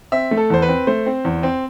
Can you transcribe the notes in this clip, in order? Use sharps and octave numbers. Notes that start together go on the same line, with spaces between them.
C4 E5
A3
A4
E2 C5
B4
C4
A3 C5
C4
E2
C4